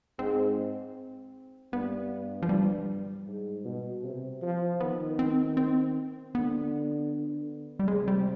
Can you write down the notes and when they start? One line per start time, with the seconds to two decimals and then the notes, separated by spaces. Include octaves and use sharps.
0.19 G#2 C4
1.73 G2 B3
2.43 F3
2.49 G3
3.27 G#2
3.65 B2
4.04 C3
4.42 F3
4.81 D#3 B3
5.19 C4
5.57 C4
6.34 D3 B3
7.79 G3
7.88 C3 G#3
8.08 G3